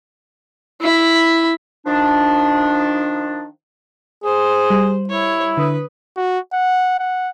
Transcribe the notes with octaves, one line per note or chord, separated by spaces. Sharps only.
E4 B5
D#3 F3 D4
G#4 C5
G3
E4 C#5
D3 B4 D#6
F#4
F#5
F#5